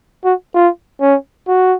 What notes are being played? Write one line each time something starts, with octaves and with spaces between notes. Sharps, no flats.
F#4
F4
C#4
F#4